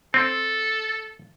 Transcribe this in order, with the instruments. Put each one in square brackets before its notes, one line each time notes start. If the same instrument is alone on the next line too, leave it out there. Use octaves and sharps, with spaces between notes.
[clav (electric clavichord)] C4 [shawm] A4